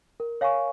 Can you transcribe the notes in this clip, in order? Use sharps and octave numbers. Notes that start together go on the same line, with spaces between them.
A#4
C#5 F5 G#5 C#6